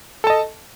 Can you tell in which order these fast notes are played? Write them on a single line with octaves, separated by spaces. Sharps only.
A4 A5 D#5